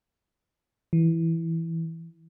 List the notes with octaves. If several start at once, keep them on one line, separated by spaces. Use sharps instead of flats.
E3